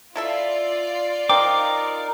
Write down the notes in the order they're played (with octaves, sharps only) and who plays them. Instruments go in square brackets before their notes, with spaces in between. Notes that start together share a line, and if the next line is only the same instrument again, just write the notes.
[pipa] E4 A4 E5 [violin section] F4 D5
[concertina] D#4 A#4 [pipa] C5 G5 [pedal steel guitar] D6